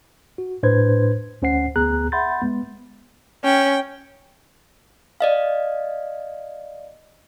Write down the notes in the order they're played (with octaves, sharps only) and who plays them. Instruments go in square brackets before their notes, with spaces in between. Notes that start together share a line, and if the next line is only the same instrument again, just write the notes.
[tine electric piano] F#4
A2 D4 B4 C5 G#6
D2 C#4 C5 F#5 C7
D2 B3 G#4 A#5 F#6
E5 F#5 B5 C6 G6 A6
G#3 B3
[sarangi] C#4 [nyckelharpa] G5
[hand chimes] D5 D#5 F5